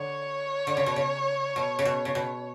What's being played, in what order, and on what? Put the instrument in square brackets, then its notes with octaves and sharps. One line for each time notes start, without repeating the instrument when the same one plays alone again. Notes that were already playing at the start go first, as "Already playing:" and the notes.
Already playing: [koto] D3 [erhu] C#5
[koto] D3
C#3
B2
C#3
B2
C#3
B2
C#3
B2